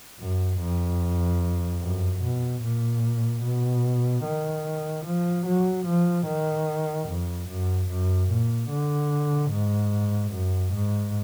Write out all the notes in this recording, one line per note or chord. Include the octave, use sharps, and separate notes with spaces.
F#2
F2
F#2
B2
A#2
B2
D#3
F3
F#3
F3
D#3
F2
F#2
F#2
A#2
D3
G#2
F#2
G#2